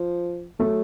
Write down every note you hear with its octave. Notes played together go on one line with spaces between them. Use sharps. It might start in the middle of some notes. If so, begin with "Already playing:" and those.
Already playing: F3
F#3 A3